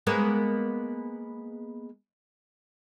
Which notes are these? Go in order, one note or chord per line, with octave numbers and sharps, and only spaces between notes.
G#3 A#3 B3